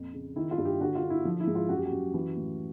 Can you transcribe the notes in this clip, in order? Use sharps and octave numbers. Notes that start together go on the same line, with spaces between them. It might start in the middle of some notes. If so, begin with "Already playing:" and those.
Already playing: F2 A#2
C#3
D#3 E4
F4
G2
G4
D3 F#4
F4
D3
E4
F3
E4
G#2
F4
F#2 F#4
G4
F#4
F#2
E3
A2